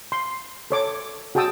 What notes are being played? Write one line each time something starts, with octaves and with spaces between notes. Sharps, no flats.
C6
A4 C#5 D6
F#4 G#4 G5 A5 D#6 E6